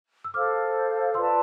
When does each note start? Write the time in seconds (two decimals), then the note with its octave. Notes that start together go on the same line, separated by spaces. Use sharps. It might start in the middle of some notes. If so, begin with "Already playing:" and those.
0.24 E6
0.34 A4 C5 F5 D6 F6
1.14 F4 B4 D5 A5 C6 E6